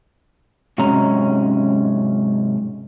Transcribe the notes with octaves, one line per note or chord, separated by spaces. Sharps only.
G#2 C3 F#3 G#3 C#4 A#5